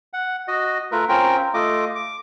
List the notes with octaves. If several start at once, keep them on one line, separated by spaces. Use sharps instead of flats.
F#5
F#4 D#5
A3 F4 A#4 B4
C4 C#4 F4 A#4 G5
A3 F4 D#5 D6
D6